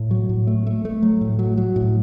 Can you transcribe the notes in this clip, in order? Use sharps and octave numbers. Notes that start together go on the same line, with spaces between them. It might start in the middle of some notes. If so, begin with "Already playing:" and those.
Already playing: A2
F#3
A2
A3
A3
A3
F#3
A2
F#3
F#3
A2